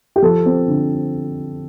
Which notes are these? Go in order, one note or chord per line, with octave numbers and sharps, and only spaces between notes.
G4
F3 A4
C4
D3